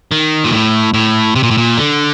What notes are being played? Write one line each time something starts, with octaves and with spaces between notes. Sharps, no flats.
D#3
A#2
A2
A2
C3
A#2
A2
A#2
D3